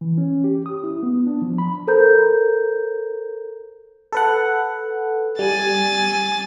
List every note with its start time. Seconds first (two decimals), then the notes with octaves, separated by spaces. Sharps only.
0.01 E3
0.18 C#4
0.44 G4
0.66 D#6
0.84 E4
1.03 B3
1.27 D4
1.42 F3
1.58 B5
1.87 A4 A#4 C5 A#5 G6
4.13 A4 B4 F#5
5.39 G3 G#5 A6